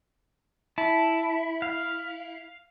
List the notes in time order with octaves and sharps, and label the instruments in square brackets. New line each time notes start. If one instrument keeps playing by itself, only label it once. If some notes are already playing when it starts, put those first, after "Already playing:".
[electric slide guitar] E4 [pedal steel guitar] A5
[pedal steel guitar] F5